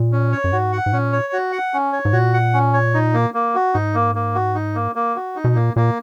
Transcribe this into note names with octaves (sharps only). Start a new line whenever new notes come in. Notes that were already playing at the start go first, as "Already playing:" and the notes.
Already playing: A#2
C#4
C#5
F#2
G#2 F#4
F#5
G#2
A#2 C#4
C#5
F#4
F#5
C#4
C#5
G#2
A#2 F#4
F#5
C#4
C#5
D#4
A#3
A#3
F#4
G#2 D#4
A#3
A#3
F#4
D#4
A#3
A#3
F#4
D#4
B2
A#2 A#3
A#2 A#3